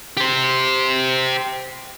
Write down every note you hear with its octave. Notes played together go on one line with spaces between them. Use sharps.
G4 C5